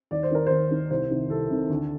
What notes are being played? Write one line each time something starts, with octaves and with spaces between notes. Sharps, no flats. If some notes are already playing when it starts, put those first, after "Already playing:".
D#2 D5
C5
D#3 A#4
D#2 C5
D#3
C2 C5
C3 D#3
C2 A4
C3 D#3
D2